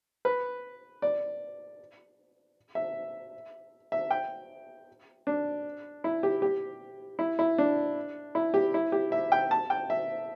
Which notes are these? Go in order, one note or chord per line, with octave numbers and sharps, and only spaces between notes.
B4
D5
E5
E5
G5
D4
E4
G4
G4
E4
E4
D4
E4
G4
E4
G4
E5
G5
A5
G5
E5